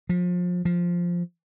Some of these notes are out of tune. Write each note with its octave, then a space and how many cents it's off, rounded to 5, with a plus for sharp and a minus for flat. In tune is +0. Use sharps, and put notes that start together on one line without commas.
F3 +30
F3 +0